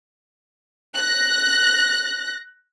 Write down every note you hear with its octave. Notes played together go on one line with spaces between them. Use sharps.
F#6 A#6